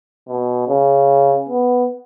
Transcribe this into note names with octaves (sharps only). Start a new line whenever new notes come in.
B2
C#3
B3